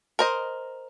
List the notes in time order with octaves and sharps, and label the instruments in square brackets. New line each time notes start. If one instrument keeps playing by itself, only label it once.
[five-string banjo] A#4 C5 D#5